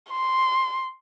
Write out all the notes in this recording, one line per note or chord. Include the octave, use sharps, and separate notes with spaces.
C6